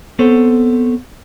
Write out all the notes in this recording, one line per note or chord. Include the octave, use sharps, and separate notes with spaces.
B3 C4 A4 C5 C#5